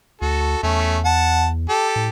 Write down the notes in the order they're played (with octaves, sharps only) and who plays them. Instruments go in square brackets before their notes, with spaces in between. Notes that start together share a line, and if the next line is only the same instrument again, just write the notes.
[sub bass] D2 [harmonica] F#4 A4
[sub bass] E2 [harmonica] A3 C#4
[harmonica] F#5 A5
G4 A4
[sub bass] A2